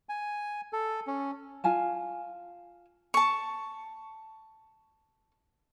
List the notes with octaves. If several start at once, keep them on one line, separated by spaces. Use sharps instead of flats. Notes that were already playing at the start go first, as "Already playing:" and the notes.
G#5
A4
C#4
F4 F5 G#5 A5
A5 C#6